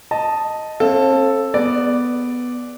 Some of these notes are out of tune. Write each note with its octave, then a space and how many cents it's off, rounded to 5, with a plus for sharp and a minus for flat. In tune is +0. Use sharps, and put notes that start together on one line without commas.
D#5 +0 A5 +0
C4 +45 A4 +0 F5 +0
B3 +0 G#4 +0 D5 -5